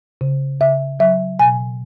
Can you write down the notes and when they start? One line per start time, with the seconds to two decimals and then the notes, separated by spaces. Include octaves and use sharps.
0.21 C#3
0.60 C#3 E5
1.00 F#3 E5
1.39 B2 G#5